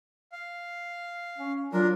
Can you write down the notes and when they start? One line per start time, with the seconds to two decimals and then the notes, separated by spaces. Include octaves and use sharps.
0.32 F5
1.38 C#4
1.73 F#3 D4 F4 A#4